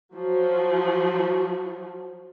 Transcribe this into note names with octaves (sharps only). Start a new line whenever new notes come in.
F3 F#3 F#4